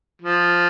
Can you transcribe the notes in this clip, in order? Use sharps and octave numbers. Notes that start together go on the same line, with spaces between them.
F3